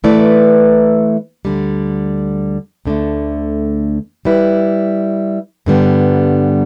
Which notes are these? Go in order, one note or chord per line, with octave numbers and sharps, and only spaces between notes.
E3 A3 E4 B4 D5
D2 D3 G3
D2 D3 A3
G3 E4 B4
G2 D3 G3 B3